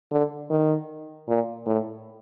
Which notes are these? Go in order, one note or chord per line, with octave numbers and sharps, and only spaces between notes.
D3
D#3
A#2
A2